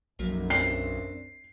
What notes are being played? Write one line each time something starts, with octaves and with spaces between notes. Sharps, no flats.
B1 F#2 F3 F#3 A#3
C4 D4 C7